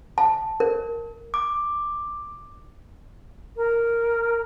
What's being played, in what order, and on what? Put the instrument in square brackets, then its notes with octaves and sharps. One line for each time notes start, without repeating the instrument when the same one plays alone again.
[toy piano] A5
A#4
[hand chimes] D6
[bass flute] A#4